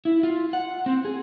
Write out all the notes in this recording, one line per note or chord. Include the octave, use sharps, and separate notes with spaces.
E4
F4
F#5
C4
G#4